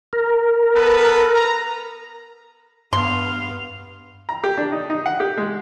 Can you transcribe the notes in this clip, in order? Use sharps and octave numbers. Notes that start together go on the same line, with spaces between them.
A#4
B3 A4 B4
A#5
G2 B3 F5 C6
A#5
G4
D4
D#4
D#4
F#5
G4
G#3